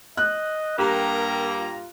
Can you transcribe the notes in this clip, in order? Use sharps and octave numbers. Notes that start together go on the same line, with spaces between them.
D#5 F#6
G2 A#3 G4 A#4 A#5
F4